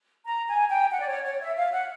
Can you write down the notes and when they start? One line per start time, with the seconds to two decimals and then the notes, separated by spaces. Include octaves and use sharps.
0.26 A#5
0.48 G#5
0.70 G5
0.91 F#5
1.00 D5
1.08 C#5
1.24 C#5
1.40 E5
1.56 F5
1.72 F#5